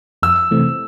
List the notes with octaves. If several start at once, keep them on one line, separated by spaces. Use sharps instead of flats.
F2 E6
C3 E3 A3 C4